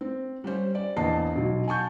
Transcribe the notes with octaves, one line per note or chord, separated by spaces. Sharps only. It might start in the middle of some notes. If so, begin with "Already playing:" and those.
C4
G3 C#4 C5
D5
A#1 E2 C5 D#5 A5 C7
B1 F#3
G#5 A5 C#6 G6